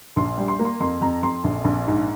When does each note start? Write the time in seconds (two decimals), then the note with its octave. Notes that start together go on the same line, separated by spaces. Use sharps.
0.16 A#1 C6
0.37 G3
0.48 C6
0.59 A#3
0.65 C6
0.80 F2 C6
1.01 F2 A#5
1.22 F2 C6
1.44 A#1
1.64 A#1
1.87 G#2